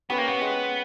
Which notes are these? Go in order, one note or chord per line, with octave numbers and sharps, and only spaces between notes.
B3 C#4 G4 B4
A#3
B3
G#3